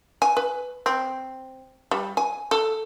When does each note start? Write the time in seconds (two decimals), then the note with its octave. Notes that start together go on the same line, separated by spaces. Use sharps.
0.22 G#5
0.37 B4
0.86 C4
1.91 G3
2.17 G#5
2.51 A4